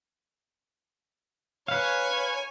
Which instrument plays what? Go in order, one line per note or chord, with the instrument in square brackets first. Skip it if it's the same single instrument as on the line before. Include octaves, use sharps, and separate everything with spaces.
[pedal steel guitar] B4 F5 [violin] C#5 G#5